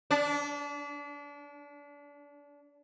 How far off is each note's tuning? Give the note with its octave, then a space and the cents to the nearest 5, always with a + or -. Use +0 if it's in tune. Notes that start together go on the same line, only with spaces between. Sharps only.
D4 -30